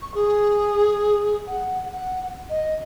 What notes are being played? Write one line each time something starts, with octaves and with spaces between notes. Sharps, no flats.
C#6
G#4
F#5
F#5
D#5